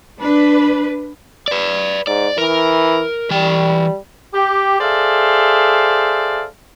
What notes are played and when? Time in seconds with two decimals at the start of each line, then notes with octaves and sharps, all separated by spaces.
0.20 D4 B4
1.48 B4 D5
2.07 G#2 D5
2.38 E3 A#4
3.31 E3 G3 G5
4.33 G4
4.80 G#4 A4 C5 D5 E5 F5